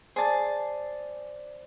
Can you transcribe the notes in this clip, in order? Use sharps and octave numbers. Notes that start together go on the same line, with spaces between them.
G#4 C5 D5 A5 A6